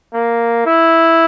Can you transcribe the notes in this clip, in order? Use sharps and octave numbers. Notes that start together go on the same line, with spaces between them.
A#3
E4